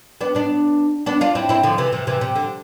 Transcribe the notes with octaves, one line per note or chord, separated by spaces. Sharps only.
B3 D4
B3 D4
B3 D4
D4 F4
C4 E4
C4 E4
D3 F3
C3 E3
C3 E3
C3 E3
C3
D3